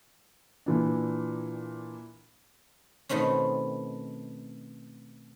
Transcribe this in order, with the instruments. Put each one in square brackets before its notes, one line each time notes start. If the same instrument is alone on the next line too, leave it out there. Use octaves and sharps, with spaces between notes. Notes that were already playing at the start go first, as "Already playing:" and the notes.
[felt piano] A#2 E3 D4
[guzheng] B2 D#3 A3 C4 C#4